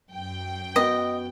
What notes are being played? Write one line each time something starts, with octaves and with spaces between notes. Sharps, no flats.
F#2 G5
B3 F#4 D#5